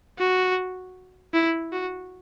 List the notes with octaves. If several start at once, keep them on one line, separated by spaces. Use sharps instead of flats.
F#4
E4
F#4